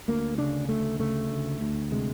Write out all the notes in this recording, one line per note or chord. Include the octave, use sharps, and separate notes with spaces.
D2 A#3
C#3 D4
D2 A3
C#3 A3
D2
D2
C3 G#3